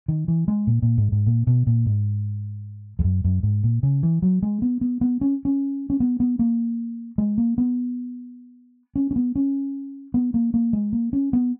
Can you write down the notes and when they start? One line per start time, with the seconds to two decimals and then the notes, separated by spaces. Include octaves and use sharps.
0.08 D#3
0.28 E3
0.48 G#3
0.67 A#2
0.82 A#2
0.98 G#2
1.12 G#2
1.27 A#2
1.47 B2
1.67 A#2
1.86 G#2
2.99 E2
3.04 F#2
3.24 F#2
3.43 G#2
3.63 A#2
3.83 C#3
4.03 E3
4.22 F#3
4.43 G#3
4.62 B3
4.81 B3
5.01 B3
5.21 C#4
5.45 C#4
5.90 C#4
6.00 B3
6.20 B3
6.39 A#3
7.18 G#3
7.38 A#3
7.58 B3
8.96 C#4
9.11 C#4
9.16 B3
9.36 C#4
10.14 B3
10.34 A#3
10.54 A#3
10.73 G#3
10.93 A#3
11.13 C#4
11.33 B3